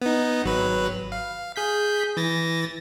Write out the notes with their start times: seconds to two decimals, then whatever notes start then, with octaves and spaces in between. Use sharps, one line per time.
0.02 B3 D#4
0.44 G#1 F#3 B4
1.12 F5
1.56 G#4 G6 B6
2.17 E3 A6 A#6